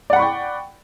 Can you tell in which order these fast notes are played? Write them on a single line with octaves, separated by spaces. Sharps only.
D5 F#5 B5 C#6 G5